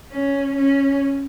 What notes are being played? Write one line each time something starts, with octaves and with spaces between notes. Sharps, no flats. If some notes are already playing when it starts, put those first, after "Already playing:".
C#4
C#4